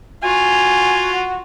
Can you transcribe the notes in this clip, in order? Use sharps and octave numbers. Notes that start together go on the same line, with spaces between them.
F4 F#4 G#5